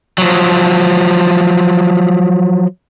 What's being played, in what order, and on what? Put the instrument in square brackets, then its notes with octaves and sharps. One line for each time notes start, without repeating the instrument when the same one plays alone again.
[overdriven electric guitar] F3 F#3